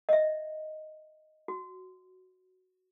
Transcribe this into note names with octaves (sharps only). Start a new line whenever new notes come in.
D#5 E5
F#4